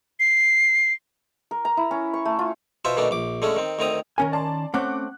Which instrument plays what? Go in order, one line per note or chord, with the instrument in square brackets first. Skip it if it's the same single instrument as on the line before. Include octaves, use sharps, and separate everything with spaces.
[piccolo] C7
[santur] A#4
A#5
E4
C#4
C#6
A3
F4
[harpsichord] B2 F4 C5 E5 C6
B2 D#3 A3 D4
A#1 D6
D3 G#3 A3 C#4
D#3 C4
D2 D#3 C4 A#5 D#6
[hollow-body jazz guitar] D#3 C#4 G#5 [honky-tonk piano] A#4
[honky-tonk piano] D5 A5 C6
[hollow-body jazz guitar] A3 C4 C#4 [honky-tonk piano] F#5 D6 F#6